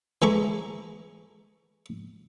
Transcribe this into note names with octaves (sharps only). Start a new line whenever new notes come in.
E3 G#3 A4 A#5 C#6 D6